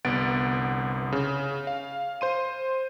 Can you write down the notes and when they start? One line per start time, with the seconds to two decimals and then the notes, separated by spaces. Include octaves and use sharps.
0.05 G1 C2 B3 F#5 A6 D7
1.12 C#3
1.67 F5
2.21 C5 C6 D#7